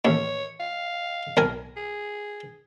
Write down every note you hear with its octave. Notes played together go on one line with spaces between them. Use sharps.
A1 D#2 C#5
F5
B1 A#4 G#5
G#4